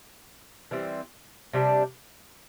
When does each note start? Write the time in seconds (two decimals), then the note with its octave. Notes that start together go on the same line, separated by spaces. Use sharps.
0.71 E3 G3 C4
1.53 C3 G3 D4